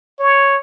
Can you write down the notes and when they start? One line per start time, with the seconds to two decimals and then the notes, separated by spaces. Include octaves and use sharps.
0.20 C#5